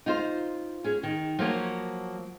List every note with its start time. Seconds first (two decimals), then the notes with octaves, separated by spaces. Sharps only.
0.06 D#4 F4 C5
0.84 C#4 G#4
1.03 D#3
1.39 F3 F#3 A#3 C#5